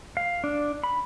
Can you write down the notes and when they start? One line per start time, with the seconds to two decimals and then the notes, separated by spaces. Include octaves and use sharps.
0.17 F5
0.44 D4
0.84 B5